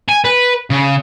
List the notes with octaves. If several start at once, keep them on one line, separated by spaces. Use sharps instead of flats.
G#5
B4
C#3